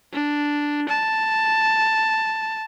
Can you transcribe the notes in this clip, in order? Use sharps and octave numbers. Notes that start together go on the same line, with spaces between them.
D4
A5